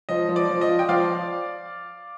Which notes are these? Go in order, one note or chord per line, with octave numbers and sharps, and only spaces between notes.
F3 D#5
F3
D5
F3
D#5
F4
G5
F3 D5 F5